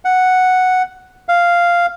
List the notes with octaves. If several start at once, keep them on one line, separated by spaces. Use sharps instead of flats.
F#5
F5